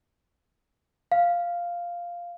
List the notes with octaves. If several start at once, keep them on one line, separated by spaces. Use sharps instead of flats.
F5